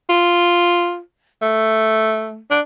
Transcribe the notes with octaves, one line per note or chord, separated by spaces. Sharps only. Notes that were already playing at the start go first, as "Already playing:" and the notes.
F4
A3
D4